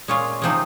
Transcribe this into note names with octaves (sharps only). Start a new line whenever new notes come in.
A#2 G#3 C#4 F4
C3 F3 G#3 C4 D#4